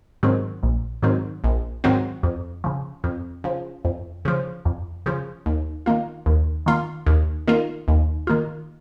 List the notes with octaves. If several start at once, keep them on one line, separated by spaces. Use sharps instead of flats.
G#2 D#3 F#3 C4
A#1
G#2 D#3 F#3 C4
A#1
G#2 D#3 F#3 C4
F2
C#3 F3
F2
C#3 F3
F2
C#3 F3
F2
C#3 F3
D#2
D#3 A#3 F4
D#2
D#3 A#3 F4
D#2
D#3 A#3 F4
D#2
D#3 A#3 F4